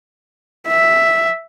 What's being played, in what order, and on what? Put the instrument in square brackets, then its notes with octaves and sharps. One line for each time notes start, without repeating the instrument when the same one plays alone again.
[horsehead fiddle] E5